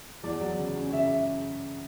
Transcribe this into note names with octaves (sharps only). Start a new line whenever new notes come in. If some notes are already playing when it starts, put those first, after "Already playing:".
E2 D5
F#3
C#3
C#4
C#3 E5